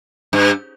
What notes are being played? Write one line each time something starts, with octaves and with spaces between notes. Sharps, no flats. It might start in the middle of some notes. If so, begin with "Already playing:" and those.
G2